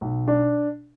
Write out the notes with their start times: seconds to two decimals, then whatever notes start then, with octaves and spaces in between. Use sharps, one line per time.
0.01 B1
0.28 D4